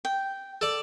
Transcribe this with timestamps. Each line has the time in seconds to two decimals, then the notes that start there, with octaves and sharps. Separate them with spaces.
0.05 G5
0.61 A4 D5